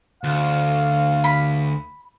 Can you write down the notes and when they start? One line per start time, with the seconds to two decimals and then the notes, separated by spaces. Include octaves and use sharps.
0.24 D2 F5
1.24 B5